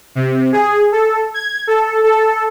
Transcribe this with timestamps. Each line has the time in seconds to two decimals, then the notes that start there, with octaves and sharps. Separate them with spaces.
0.15 C3
0.52 G#4
0.92 A4
1.34 G#6
1.67 A4
2.04 A4